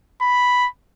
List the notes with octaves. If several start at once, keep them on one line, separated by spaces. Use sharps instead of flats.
B5